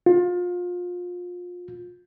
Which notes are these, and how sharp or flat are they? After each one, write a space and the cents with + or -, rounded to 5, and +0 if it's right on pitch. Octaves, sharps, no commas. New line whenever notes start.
F4 +30